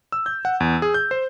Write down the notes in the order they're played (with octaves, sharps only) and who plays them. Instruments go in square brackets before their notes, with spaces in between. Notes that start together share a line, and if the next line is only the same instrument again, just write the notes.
[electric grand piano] E6
G6
F#5
E2
G#4
G6
C5